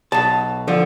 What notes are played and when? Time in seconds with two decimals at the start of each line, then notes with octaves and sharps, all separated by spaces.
0.12 B1 B2 A5
0.68 D3 F3